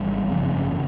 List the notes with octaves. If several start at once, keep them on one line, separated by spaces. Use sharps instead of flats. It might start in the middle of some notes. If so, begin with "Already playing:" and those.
Already playing: G#1 G#2 E3 G3
G1 F2 C#3
C#3 E3